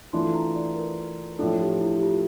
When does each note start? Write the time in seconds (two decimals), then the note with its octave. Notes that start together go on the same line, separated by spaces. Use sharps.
0.13 E3 A3 D4 F4 C6
0.34 A#5
0.56 D5
0.76 A#4
1.39 A2 F3 A3 D4 A4
1.61 G4
1.81 E4
1.97 G4
2.03 F4